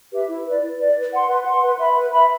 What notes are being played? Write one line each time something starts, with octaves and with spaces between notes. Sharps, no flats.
G4 B4 E5
E4
B4 D5
E4
B4 D5
B4
F#5 C6
B4
F#5 C6
B4
E5 B5
B4
E5 B5